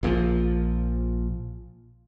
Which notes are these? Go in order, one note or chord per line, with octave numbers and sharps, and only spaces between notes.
A#1 A#2 D3 F3